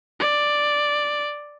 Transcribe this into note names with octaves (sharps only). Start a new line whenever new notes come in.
D5